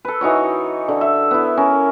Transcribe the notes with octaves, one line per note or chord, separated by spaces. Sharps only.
A4 B4
E3 D#4 F#4 C#5
D3
E5
B3 E4
C#4 A#4